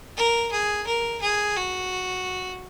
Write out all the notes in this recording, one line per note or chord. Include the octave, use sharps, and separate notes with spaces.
A#4
G#4
A#4
G#4
F#4